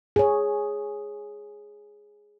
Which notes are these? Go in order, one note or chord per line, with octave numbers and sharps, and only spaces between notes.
G#4 C#5